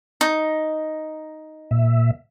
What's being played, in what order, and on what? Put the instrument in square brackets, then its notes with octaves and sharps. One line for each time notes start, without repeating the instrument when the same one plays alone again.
[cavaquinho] D#4
[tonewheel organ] A#2 E5